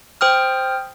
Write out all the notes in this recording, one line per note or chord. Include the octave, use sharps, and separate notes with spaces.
C5 G5 D#6 F6